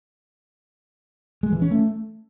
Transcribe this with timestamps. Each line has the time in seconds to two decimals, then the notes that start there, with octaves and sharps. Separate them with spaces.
1.43 G#3
1.52 E3
1.62 C#4
1.71 A3